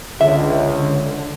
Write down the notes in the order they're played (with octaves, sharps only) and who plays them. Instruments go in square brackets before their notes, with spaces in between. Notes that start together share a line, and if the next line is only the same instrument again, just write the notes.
[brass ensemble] C#2 [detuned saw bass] D3 [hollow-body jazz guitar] E5